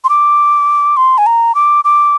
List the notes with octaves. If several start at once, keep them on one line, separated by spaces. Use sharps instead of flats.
C6
D6
C6
G#5
A#5
D6
D6